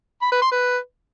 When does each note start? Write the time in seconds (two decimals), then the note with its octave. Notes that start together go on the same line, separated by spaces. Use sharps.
0.22 B5
0.32 B4
0.42 C6
0.52 B4